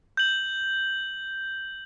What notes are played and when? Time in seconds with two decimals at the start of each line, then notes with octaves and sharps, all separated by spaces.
0.17 G6 F#7